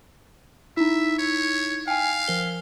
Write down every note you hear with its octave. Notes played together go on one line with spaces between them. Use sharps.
D#4 E4 E5
C#5
F5 G5 G#5
F3 A#4 G7